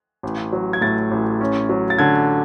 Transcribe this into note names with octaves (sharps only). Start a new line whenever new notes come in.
A1
F#3
G#6
A2 A6
A1
C#4
F#3
A6
D3 G#6